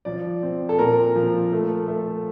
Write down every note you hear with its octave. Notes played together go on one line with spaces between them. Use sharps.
F3 D5
C4
A4
A#2 A#4
F3
A3
A3